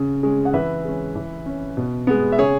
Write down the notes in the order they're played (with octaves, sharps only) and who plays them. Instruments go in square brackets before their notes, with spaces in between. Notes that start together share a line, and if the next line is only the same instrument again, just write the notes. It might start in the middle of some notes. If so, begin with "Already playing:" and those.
Already playing: [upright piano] C#3
G#3 C#4
F#5
E3 B4 E5
G#3 C#4
E3
C#4
B2
G#3 B3
E5
C#3 G#4 C#5